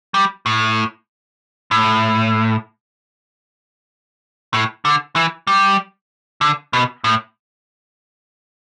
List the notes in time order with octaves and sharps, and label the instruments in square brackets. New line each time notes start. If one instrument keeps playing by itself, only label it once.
[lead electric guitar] G3
A2
A2
A2
D3
E3
G3
D3
B2
A2